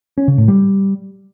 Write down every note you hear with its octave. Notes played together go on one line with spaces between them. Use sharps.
C#4
C#3
A2
G3